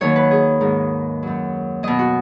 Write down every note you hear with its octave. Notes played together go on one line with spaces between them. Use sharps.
D#2 D#3 F#3 C#5
B4
G#4
G#2 D#3 G#3
F#2 F#3
B2 F#3 D#5
F#4